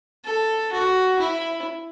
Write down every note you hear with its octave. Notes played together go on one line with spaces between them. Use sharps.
A4
F#4
E4